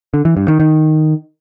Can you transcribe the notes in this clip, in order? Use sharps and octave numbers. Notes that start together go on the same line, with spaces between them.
D3
E3
G2
D#3
D#3